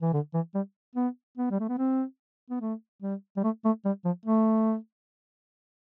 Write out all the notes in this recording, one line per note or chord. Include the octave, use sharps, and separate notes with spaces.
E3
D3
E3
G3
B3
B3
G3
A3
B3
C4
B3
A3
G3
G3
A3
A3
G3
F3
A3